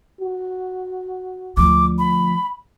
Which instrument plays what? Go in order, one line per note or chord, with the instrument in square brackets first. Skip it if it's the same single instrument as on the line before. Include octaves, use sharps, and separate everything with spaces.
[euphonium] F#4
[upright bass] D2 F3 [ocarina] D6
[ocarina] B5